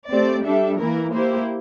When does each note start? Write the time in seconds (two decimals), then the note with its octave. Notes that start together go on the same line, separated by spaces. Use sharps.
0.10 A3 C4 G4 D5
0.45 G3 D4 A4 E5
0.78 E3 A#3 E4 A#4
1.12 A#3 E4 G4 C5